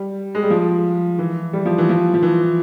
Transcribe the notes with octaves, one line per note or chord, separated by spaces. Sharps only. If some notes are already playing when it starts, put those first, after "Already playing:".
Already playing: G3
G#3
G3
F3
E3
G3
F3
E3
F3
F3
E3